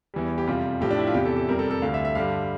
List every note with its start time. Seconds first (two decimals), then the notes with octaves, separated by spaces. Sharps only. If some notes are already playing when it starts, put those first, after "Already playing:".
0.14 E2 E3 G3
0.38 G4
0.47 F2 C3 G3 F4
0.81 A2 F3 G4
0.91 D4
0.99 E4
1.07 F4
1.14 E2 C3 E3 G4
1.25 A4
1.37 A4
1.48 F2 C3 G3 A#4
1.59 A4
1.71 A4
1.82 D2 D3 G3 F5
1.94 E5
2.05 E5
2.15 G2 D3 G3 F5